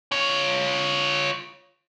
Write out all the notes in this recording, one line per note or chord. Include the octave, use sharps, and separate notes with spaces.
F4 C#5